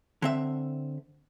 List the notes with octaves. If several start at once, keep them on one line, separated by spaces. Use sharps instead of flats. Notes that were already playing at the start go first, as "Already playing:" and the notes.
D3 C4 E5